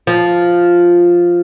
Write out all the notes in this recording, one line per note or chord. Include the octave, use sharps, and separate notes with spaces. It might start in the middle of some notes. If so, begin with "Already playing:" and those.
F3